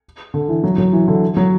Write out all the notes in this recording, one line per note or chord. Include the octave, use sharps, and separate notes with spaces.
D3
E3
F#3
F#3
E3
D3
F#3